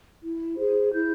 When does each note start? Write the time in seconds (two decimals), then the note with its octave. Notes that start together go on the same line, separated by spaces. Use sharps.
0.23 E4
0.57 G#4 C5
0.92 E4 G6